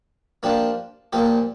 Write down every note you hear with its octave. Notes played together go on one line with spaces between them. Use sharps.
F3 A#3 D4 G4
A#2 F3 A#3 G4